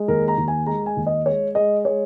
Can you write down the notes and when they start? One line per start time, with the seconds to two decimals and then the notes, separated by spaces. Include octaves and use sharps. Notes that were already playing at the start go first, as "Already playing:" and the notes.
Already playing: G#3
0.08 D#2 A#4
0.28 A#5
0.38 D#2
0.48 G#5
0.66 G#3 A#5
0.86 G#5
0.96 D#2
1.06 D#5
1.26 G#3 C#5
1.55 G#3 D#5
1.85 G#3 C#5